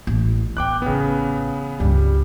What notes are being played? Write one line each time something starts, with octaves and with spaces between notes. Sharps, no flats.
A1
B3 G5 D6 F#6
A1 C#3 B3 C#4
C#2 G2 G3